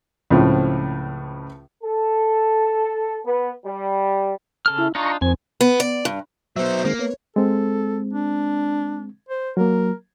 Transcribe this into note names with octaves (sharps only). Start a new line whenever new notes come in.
C#2 A2 F3 C4
A4
B3
G3
C#3 A4 F6
E4
D4 D#4 F4 A#5 C#6
F2 D#3 C4 G#5
B3
D5
G2
F#3 B3 C5 E5
D#3 G#3 A#3 C4
B3 C#5
G#3 C4 A4
D4
C5
F#3 A#3 A#4